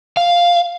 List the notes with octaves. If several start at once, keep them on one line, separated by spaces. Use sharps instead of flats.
F5